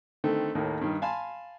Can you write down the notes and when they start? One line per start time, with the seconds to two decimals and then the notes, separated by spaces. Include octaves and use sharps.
0.24 D3 D#3 A3 C4
0.55 D#2 A2 D#3 A#3 D#4
0.81 G2 D#3
1.02 F5 G#5 A5 B5 C6